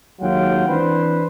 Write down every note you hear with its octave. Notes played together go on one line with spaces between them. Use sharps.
D#2 F#3 G#3 F4 F#5 G5
E3 C4 D4 B4 C5